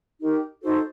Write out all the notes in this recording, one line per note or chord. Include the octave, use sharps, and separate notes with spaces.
D#4 G4 A#4
D#4 F#4 A4 C5